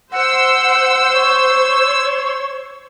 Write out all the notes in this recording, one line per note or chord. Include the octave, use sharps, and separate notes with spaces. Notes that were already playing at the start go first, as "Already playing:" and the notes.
C5 F#5 E6
C#5